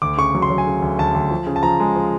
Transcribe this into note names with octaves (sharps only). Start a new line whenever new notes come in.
D2 D6
C#3 C#6
F#3
C6
F#3
G#5
C#3
D2
D2 A5
D2
F3
C#3
A5
F3 A#5
G#3
F3